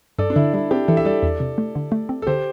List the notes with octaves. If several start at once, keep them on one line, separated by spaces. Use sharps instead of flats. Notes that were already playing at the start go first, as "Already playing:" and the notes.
G2 A4 D5
D4
D3 E4
G3 E4
C4 D4 G4
E3 E4 A4
E5
G3 A4 D5
E2
C3
A3
D3
A3
C4
A4
D3 G4 C5